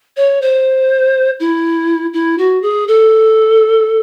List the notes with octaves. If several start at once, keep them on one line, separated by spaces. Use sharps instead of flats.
C#5
C5
E4
E4
F#4
G#4
A4